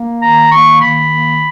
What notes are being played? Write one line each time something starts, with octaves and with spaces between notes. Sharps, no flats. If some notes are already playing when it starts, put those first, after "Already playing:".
Already playing: A#3
D#3 A#5
A#3 C#6
D#3 B5
A#3